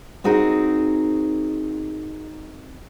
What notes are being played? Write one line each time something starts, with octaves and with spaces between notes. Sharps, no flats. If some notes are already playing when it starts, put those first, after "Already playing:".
C4 D#4 F#4 G#4 A#4